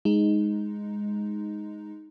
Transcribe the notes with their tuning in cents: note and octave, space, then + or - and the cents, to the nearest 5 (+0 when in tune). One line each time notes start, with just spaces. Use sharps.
G#3 +0 D#4 +0